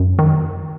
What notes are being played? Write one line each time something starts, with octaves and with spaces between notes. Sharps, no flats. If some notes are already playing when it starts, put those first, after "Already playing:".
Already playing: F#2
D#3